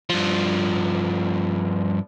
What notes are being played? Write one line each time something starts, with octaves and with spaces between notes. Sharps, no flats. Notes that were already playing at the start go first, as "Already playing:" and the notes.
G2 F3